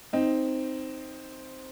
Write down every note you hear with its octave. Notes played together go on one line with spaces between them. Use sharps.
C4 D#4